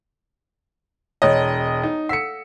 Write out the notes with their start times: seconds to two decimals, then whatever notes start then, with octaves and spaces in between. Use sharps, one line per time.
1.22 E1 C#5 D#5
1.83 D#4
2.09 A4 F5 F#5 E6 C#7